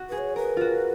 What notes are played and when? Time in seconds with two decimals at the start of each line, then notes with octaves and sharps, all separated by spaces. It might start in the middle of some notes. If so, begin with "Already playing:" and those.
Already playing: F#4
0.09 G#4 B4
0.18 C#5
0.36 A#4 B4
0.57 F4 F#4